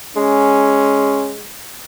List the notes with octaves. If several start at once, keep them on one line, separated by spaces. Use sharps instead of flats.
G#3 C#4